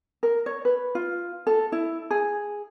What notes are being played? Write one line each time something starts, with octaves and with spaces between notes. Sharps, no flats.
A#4
C#5
B4
F4
A4
E4
G#4